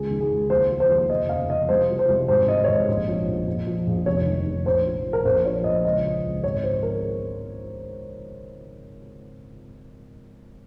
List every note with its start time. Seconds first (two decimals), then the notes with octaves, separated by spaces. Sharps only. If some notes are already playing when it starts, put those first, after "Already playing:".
Already playing: C#2 G#4
0.11 D#3
0.21 G#4
0.31 C#2
0.50 D#2 C5
0.70 F3
0.80 C5
0.90 D#2
1.10 F1 D#5
1.29 C#3 F5
1.49 F3 D#5
1.69 C2 C5
1.89 F3
1.99 C5
2.08 C2
2.28 G#1 C5
2.48 D#3 D#5
2.64 C#5
2.68 G#1 D#5
2.88 A#1
3.08 F3
3.28 A#1
3.47 A#1
3.67 F3
3.87 A#1
4.06 F1 C#5
4.27 D#3
4.46 F1
4.66 A#1 C5
4.86 F3
5.05 A#1
5.13 A#4
5.25 A#1 C5
5.45 F3 C#5
5.64 A#1 D#5
5.85 C#2 D#5
6.04 F3
6.24 C#2
6.44 G#1 C#5
6.63 F3 C5
6.83 A#4